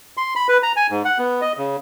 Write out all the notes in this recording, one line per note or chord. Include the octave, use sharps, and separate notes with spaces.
C6
B5
B4
A#5
G#5
G#2
F#5
B3
D#5
C#3